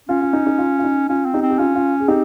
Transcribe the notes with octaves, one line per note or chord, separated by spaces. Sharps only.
C#4 F4
F4
D#4
D#4
F4
F4
D#4
C#4 F4
C4
D#4 G4
C4
G4
C#4 F4
F4
G#4
C4 D#4 G4